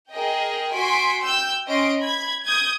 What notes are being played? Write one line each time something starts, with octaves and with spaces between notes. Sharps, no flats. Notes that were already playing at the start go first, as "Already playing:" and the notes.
G#4 A#4 D#5 G5
F#4 G#5 C6 B6 D7
G5 E6 G6
C#4 D#5 C6 D7
B5 G#6
D#6 G6 G#6